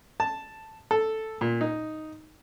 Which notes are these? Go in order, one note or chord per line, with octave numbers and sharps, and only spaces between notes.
A5
A4
A#2
D#4